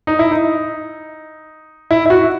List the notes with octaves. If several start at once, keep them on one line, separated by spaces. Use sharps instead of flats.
D#4
E4
D#4
E4
E4
F#4